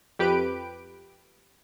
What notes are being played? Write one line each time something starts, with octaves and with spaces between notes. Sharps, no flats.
F2 G4 B4 D7